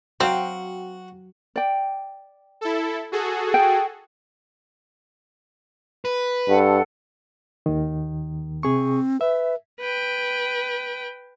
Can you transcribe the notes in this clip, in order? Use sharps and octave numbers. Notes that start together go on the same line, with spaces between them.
F#3 C4 F#4 F5 G5
D5 G5
E4 A4
F#4 G#4 A4
G5
B4
G2 A4 F#5
D#2 D#3
C3 C4 G#4 C#6
B4 E5
B4 G5